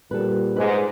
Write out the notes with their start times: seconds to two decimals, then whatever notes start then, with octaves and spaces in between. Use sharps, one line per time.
0.11 A#2 D3 G3 A4 B4
0.56 G#2 B4 D5